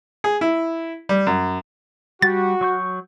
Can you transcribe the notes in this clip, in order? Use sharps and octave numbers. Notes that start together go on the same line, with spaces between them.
G#4
E4
G3
F#2
G3 F#4 G4 A6
F#3 C#6 G6